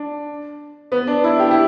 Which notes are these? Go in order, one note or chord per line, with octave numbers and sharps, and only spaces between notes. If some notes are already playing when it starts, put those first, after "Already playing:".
Already playing: D4
B3
D4
E4
G4
E4